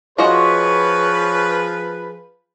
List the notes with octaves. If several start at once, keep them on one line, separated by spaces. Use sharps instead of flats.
F3 F4 F#4 G#4 B4 C#5 D#5